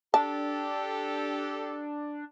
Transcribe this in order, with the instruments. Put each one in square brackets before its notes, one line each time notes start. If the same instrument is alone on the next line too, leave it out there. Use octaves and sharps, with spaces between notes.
[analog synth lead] D4 [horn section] G4 A4 [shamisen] A5